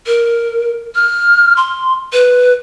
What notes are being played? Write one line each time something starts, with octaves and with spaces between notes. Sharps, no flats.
A#4
F6
C6
B4